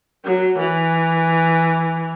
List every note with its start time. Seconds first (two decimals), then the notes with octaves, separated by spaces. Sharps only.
0.25 F#3
0.59 E3